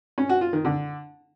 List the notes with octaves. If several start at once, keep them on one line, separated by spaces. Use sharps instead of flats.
C#4
F#4
F4
D#3
D3